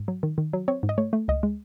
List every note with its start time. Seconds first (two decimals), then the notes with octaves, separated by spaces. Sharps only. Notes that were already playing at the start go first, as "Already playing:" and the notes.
Already playing: G#2
0.08 F#3
0.23 D#3
0.38 D#3
0.53 F#3
0.68 C4 C#5
0.83 G#2
0.89 D#5
0.98 A3 C#5
1.13 A3
1.28 C#2 D#5
1.43 G#3